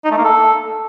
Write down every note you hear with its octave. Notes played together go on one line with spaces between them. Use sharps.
D#4
A3
A#3
A4